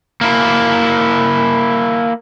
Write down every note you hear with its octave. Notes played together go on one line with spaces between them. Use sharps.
A#3 E4